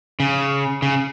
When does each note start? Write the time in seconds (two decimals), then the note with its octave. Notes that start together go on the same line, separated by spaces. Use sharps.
0.20 C#3
0.82 C#3